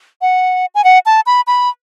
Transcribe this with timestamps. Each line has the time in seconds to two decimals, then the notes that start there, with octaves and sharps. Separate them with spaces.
0.22 F#5
0.75 G#5
0.84 F#5
1.06 A5
1.26 B5
1.47 B5